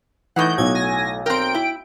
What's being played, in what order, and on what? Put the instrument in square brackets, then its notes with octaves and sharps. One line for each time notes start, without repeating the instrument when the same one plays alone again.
[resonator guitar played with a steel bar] A2 D#4 F#5 [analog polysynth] E3 G6
[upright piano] B1 [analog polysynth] G#6
[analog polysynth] G#5 A#6
[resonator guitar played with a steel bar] C4 A#4 [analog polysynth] G5 D7
[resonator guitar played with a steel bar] E4